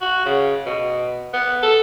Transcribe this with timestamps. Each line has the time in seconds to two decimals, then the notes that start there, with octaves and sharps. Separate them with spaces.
0.01 F#4
0.25 C#3
0.66 B2
1.33 B3
1.62 A4